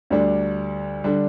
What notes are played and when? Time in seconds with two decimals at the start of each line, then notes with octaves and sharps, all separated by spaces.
0.10 D2 D3 G3 D4
1.04 D3 G3 D4